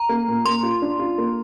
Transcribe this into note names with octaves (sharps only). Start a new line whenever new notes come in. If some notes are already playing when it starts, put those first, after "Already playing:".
Already playing: A#5
A#3
A#2
A#3 C6
F4
D4
F4
A#3